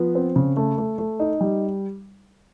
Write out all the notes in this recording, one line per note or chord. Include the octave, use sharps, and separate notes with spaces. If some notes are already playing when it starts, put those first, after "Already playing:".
Already playing: F3 B3
C4
C#3
A3
A3
A3
D#4
G3